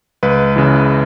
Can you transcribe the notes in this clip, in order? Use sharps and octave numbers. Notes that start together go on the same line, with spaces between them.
C#2 B4
C#3 E3